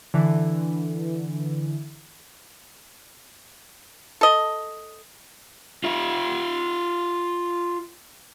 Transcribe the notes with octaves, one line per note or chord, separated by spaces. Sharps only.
D3 E3
A4 D#5
F4 E5